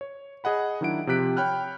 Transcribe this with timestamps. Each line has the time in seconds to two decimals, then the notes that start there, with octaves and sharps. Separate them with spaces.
0.01 C#5
0.44 G#4 D#5 F#5 B5
0.81 D#3 F#3 D4 E4 F#5 D7
1.07 C3 F3 G4 F#6 B6 D7
1.37 C#5 G5 B5 F6 F#6